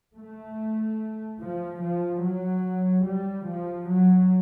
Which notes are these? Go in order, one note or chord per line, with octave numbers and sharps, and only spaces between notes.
A3
F3
F3
F#3
G3
F3
F#3